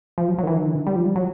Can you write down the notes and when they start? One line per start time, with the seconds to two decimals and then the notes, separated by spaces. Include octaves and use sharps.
0.18 F3
0.28 F#3
0.38 F#3
0.43 D#3
0.47 E3
0.57 D#3
0.67 D3
0.87 G3
0.96 F3
1.06 G3
1.16 F#3